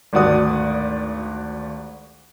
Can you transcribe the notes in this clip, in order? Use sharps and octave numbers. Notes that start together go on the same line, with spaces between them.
G#1 D2 G3 F#4 D5 D#6